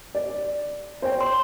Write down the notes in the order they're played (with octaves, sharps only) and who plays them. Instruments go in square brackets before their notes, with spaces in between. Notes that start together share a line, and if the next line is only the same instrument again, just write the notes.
[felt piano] D5
C5 C#5 G5
[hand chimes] C6